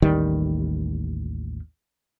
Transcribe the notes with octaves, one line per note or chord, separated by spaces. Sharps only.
A1 D#2 D#3 G3